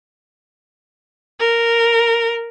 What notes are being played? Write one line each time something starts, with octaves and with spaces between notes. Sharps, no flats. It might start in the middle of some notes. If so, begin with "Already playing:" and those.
A#4